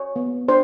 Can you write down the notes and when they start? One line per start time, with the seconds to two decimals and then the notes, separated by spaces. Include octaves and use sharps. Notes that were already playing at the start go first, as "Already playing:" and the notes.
Already playing: C#5
0.16 B3
0.48 D4 C5